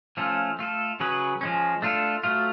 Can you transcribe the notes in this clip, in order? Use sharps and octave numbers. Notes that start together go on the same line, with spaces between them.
F3 A3 C#4 F4 A4
A3 F4 A4
C#3 F#3 C#4 G#4 B4
F3 G#3 C#4
A3 D4 F4 A4
F#3 A3 F4